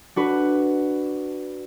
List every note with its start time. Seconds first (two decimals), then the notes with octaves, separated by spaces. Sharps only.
0.16 D4 F#4 B4